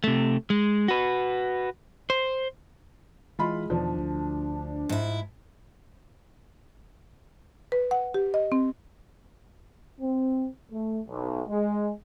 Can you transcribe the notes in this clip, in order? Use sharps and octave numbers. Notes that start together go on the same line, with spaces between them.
C3 A3
G#3
F#4 B4
C5
E3 G#3 F4 B5 C6
E2 B2 D#3 F3 D4
D2
G#2 E4
B4
F#5
G4
D#5
C4
C4
A3
B1
G#3